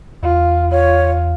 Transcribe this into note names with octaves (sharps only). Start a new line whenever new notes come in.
E2 F4
F4 C#5